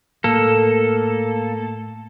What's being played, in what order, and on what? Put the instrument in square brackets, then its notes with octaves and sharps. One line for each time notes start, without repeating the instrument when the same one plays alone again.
[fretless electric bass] A2 [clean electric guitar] A#3 [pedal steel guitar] A4